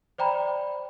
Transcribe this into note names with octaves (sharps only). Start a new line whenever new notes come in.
C5 D5 G5 A#5 B5